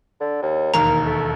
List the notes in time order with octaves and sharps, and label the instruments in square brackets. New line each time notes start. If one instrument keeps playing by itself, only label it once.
[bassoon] D3
D#2
[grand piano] E1 D#2 [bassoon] A#3 [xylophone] A#5
[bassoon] A3